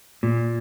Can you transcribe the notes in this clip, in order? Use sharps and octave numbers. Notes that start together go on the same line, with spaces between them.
A#2